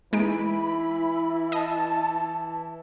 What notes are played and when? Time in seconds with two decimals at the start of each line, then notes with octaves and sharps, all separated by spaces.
0.13 E3 G#3 D#4 E4 B5 D7
1.52 D#5 A5